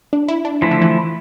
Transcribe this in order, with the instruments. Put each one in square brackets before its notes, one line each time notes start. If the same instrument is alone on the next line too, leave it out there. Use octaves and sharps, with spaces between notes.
[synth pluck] D4
E4
D4
[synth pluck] E3 [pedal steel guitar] F3 A3 E4
[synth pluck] D3
E3